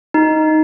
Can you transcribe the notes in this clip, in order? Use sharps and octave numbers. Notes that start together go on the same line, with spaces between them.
D#4